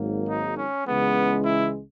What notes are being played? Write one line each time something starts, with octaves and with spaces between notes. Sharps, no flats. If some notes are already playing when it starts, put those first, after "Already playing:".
Already playing: G#1 G#2 F#3 A#3
D#4
C#4
C#2 C#3 E3 G#3 B3
E4